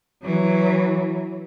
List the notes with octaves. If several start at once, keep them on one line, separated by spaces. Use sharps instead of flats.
E3 F#3